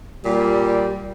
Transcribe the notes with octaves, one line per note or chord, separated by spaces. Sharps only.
A#2 G3